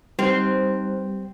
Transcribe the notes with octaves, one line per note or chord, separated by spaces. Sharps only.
G3 C4 D#4 B4 C5